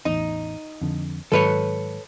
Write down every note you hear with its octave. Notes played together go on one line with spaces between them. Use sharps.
A1 E2 D#4
F2 D3
G#2 D#3 F#3 A4 B4 C#5